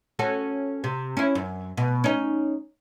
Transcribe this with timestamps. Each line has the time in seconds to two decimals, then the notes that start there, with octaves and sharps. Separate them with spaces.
0.19 C#4 F#4 A4
0.84 C3
1.17 C#4 E4
1.35 F#2
1.77 B2
2.04 C#4 D#4